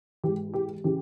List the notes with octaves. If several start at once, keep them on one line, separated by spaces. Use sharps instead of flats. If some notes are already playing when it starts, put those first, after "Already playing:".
G#2 E3 G4
G4
C#3 E3 G4